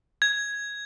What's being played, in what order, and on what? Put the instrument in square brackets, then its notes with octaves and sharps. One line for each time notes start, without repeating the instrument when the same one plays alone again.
[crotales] G#6